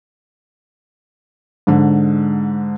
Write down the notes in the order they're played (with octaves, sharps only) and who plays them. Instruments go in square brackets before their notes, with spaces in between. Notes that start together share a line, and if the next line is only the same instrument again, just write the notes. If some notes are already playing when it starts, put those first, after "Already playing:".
[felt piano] G#2 D3